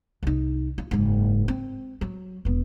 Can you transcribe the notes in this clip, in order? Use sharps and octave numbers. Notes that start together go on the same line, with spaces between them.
C2 D#4
F4
F#1 G#2
C4
F#3
E1 B3